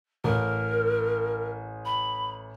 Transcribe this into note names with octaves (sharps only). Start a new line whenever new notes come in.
A1 A#4
B5